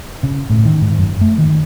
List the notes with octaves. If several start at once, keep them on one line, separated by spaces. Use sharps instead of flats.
C#3
A2
D#3
G#2
F#2
A3
D#3